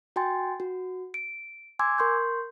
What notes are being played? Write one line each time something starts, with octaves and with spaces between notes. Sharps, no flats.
F#4 G5 G#5 C6 A6
F#4
D7
G#5 C6 D6 E6 G#6
A#4 C6 C#6 G6